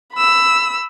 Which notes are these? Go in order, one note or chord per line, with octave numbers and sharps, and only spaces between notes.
B5 E6